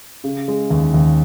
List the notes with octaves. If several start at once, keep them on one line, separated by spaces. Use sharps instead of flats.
C#3
G#3
D#2
D#2